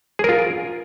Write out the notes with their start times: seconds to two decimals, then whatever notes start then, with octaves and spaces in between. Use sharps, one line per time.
0.19 G#4
0.24 A#4
0.29 F4